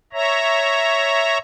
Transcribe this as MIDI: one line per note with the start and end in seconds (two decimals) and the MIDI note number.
0.13 1.38 73
0.13 1.38 76
0.13 1.38 82